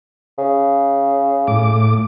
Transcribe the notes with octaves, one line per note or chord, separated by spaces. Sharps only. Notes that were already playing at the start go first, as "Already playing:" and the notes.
C#3
A2 D6